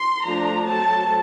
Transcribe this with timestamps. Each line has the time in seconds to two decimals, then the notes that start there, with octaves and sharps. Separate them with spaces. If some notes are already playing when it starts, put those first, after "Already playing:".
Already playing: C6
0.24 F3 A3 D4 A#5
0.67 F#3 A3 C4 A5